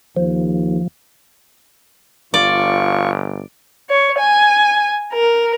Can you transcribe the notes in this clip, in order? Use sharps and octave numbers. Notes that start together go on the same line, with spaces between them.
D#2 F3
G1 F4 D5 C#6
C#5
G#5
A#4